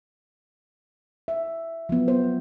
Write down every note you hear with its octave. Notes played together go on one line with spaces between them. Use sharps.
E5
F3 F#3 B3
C5